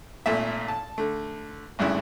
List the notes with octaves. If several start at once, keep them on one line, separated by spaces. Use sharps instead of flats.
G#1 A#2 A3 E5
A5
D3 A3
G#1 D2 G2 C#3 E4